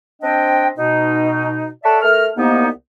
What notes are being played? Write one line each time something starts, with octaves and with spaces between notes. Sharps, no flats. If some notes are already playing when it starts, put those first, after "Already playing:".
C4 D4 D#5 G5
B2 D#4
A4 C#5 D5 E5 F#5 A5
A3 A#4 F6
C2 A#3 B3 D#4